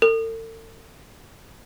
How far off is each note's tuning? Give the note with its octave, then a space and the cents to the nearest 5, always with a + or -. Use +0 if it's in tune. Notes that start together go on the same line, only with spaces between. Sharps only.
A4 +40